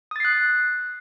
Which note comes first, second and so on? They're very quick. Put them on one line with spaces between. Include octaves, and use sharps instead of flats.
D#6 A6 C7 F#6